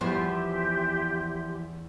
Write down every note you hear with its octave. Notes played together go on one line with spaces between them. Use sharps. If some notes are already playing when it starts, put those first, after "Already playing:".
E2 E3 F3 G4 C5 E5 C6